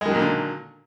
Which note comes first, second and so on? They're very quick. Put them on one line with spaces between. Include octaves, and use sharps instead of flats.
G#3 D#3 F#3 A#2 D3